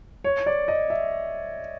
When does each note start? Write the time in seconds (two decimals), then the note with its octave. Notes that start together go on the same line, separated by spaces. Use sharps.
0.24 C#5
0.46 D5
0.68 D#5
0.90 E5